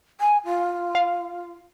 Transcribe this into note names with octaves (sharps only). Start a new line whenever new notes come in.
G#5
F4
F5